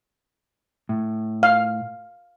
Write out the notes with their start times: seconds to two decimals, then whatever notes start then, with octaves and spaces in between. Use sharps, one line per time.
0.89 A2
1.43 F5